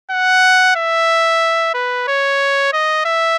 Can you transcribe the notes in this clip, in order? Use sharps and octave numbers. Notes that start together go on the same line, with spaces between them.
F#5
E5
B4
C#5
D#5
E5